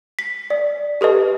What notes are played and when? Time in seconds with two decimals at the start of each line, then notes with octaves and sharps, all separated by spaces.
0.19 B6
0.50 D5
1.01 G4 A4 B4 D#5